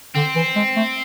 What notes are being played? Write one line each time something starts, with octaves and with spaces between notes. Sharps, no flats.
D3 C4
E3
G#3
A3